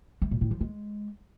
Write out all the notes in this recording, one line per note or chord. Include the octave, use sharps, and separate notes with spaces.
A3
A#2
A2
F3
G#3